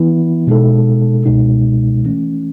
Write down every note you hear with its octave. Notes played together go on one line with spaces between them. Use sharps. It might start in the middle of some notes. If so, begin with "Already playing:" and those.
Already playing: E3 B3 E4
B2 G#3 D#4 A4
C#2 B2 G#3 D#4
E3 A3 C#4